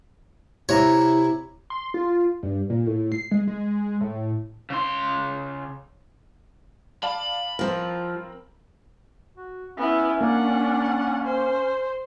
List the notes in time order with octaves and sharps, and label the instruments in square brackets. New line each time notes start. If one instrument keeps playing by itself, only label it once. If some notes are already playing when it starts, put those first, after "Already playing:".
[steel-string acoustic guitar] C3 A#5 [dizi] E4 [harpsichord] C#5
[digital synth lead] C6
F4
G2
A#2
A2
C7
G#3
G#3
A2
[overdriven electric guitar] C#3 C6
[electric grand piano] D5 F5 A5 [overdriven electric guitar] B5
[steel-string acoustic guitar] F3 F4 [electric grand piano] C4 A#4
[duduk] F#4
[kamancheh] B3 E4 [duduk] C#4
[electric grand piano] A#3 [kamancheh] D4 F#5
[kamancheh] C5